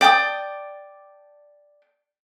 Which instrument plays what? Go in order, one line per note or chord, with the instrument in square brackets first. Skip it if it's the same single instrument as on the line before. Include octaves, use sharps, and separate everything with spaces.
[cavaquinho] D5 G5 A5 D#6